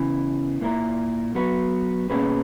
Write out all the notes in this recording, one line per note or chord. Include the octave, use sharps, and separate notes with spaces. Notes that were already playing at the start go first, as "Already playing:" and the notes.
Already playing: E2 C#3 E3
A#2 A#3 E4 A#4
F#3 B3 F#4 B4
B2 A#3 C#4 G#4 B4